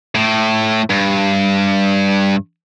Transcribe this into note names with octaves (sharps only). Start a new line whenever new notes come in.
A2
G2